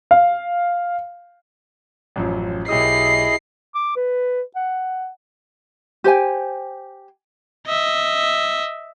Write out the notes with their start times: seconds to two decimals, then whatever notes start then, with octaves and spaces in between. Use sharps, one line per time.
0.11 F5
2.16 A1 F#2 F3
2.68 B1 E4 G4 G#4 D#5 D#6 C7
3.75 D6
3.96 B4
4.55 F#5
6.04 G4 C5 G5 G#5
7.66 D#5 E5